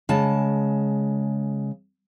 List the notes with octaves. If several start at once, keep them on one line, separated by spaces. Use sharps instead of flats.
C#3 G#3 A5